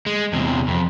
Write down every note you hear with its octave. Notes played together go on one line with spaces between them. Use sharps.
G#3
E2 C3
F2